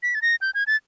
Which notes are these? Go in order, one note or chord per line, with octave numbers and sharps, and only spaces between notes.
B6
A6
A#6
G6
G#6
A6